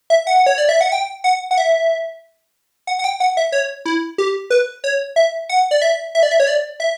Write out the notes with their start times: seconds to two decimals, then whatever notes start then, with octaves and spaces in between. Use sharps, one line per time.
0.10 E5
0.27 F#5
0.46 C#5
0.58 D5
0.69 E5
0.81 F#5
0.92 G5
1.24 F#5
1.51 F#5
1.58 E5
2.87 F#5
2.99 F#5
3.04 G5
3.20 F#5
3.37 E5
3.52 C#5
3.85 E4
4.18 G4
4.50 B4
4.84 C#5
5.16 E5
5.49 F#5
5.71 D5
5.82 E5
6.15 E5
6.23 D5
6.31 E5
6.40 C#5
6.47 D5
6.80 E5